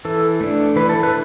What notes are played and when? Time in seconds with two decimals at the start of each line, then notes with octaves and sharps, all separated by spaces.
0.05 E3 A4
0.41 A3 D4
0.76 E3 B4
0.89 A4
1.03 B4